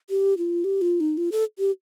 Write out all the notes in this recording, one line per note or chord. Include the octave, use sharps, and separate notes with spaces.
G4
F4
G4
F4
D#4
F4
A4
G4